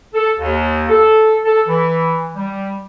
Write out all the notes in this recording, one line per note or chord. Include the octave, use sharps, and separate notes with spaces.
A4
D#2
A4
A4
E3
G3